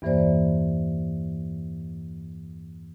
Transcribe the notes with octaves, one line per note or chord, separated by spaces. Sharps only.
E2 G2 E3 A#3 C5 D5